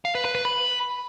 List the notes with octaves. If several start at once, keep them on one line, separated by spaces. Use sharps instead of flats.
F5
B4
B4
B4
B5